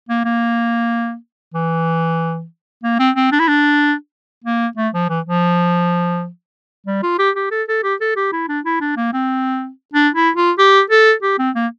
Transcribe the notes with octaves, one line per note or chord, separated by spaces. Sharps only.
A#3
A#3
E3
A#3
C4
C4
D4
E4
D4
A#3
A3
F3
E3
F3
G3
F4
G4
G4
A4
A4
G4
A4
G4
E4
D4
E4
D4
A#3
C4
D4
E4
F4
G4
A4
G4
C4
A#3